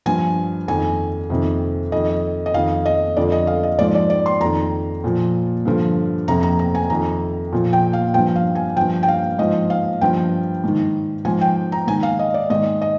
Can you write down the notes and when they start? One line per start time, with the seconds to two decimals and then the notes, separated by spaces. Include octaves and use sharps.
0.06 G2 F3 G#5
0.68 F2 D#3 G#5
1.30 F2 C3 D#3
1.92 F2 D#3 D#5
2.46 D#5
2.54 F2 D#3 F5
2.86 D#5
3.16 F2 D3 F3 D5
3.32 D#5
3.47 F5
3.63 D#5
3.78 G#2 F3 D5
3.95 D5
4.10 D5
4.26 C6
4.41 F2 A#5
4.46 D#3
5.04 A#2 F3
5.65 G2 D3 F3
6.28 F2 C3 F3 A#5
6.43 A#5
6.59 A#5
6.75 G#5
6.90 F2 D#3 A#5
7.52 A#2 F3
7.73 G5
7.93 F5
8.14 G2 F3 G5
8.36 F5
8.55 G#5
8.77 G2 F3 G5
9.03 G5
9.08 F5
9.39 G#2 F3 D#5
9.70 F5
10.01 G2 F3 G5
10.64 G#2 D#3
11.25 G#2 F3 G#5
11.41 G5
11.72 A#5
11.87 G#2 D#3 G#5
12.03 F5
12.19 D#5
12.34 D5
12.50 G#2 D#3 D#5
12.82 D#5